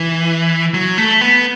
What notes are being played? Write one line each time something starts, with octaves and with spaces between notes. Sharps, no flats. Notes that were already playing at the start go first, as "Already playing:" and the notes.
Already playing: E3
F#3
A3
B3